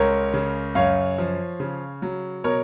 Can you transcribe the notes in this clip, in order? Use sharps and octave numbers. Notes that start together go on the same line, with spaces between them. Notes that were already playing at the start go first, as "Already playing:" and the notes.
Already playing: C#2 A#4 C#5
C#3
F#2 C#5 F5
F3
C#3
F#3
B2 A#4 C#5